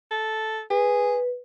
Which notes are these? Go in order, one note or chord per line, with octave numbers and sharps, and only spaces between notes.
A4
G#4 B4